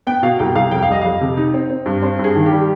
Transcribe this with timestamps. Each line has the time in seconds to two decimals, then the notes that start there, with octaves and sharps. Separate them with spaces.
0.07 B3 G5
0.23 B2 F5
0.39 C2 G5
0.55 C2 F5
0.71 F2 G5
0.83 F5
0.89 G3 D#5
1.02 F2 F5
1.21 C3
1.37 D#4
1.54 C4
1.70 C4
1.86 G2
2.02 C4 C5
2.19 G2 G#4
2.36 D#3
2.46 G4
2.52 G3